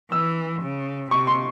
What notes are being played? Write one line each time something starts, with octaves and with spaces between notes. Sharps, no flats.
E3 E6
C#3
C3 C#6
C6